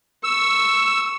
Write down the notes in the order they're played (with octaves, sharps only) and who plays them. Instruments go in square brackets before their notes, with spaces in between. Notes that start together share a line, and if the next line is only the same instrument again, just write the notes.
[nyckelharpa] C#6 [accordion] E6